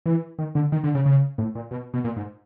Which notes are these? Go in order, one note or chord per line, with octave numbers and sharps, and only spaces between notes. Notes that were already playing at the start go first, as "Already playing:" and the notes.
E3
D#3
D3
D#3
D3
C#3
C#3
A2
A#2
B2
B2
A#2
G#2